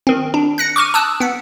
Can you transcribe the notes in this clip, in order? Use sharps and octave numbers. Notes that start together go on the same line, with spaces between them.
D#3 C4
D4
F#6 A#6 C#7
C#6 D6 F6 D#7
A5 D#6 E6 F#6
B3 F#5